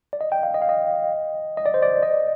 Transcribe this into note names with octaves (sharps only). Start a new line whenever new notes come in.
D5
D#5
G5
F5
D#5
F5
D#5
D#5
D5
C5
D5
D#5